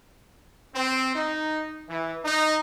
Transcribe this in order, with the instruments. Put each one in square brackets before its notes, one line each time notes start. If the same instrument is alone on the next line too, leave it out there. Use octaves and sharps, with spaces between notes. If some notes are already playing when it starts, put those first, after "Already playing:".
[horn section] C4
D#4
E3
D#4